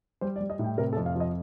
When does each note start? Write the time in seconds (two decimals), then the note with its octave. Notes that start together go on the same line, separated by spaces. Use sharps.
0.21 G3 C5
0.36 D5
0.41 G3
0.50 D#5
0.59 A2
0.64 G5
0.78 C3 A#4
0.93 A4
0.97 F2
1.06 F5
1.16 F3 D#5